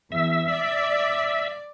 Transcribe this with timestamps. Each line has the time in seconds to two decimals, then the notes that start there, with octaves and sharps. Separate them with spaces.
0.12 E2 E5
0.52 D5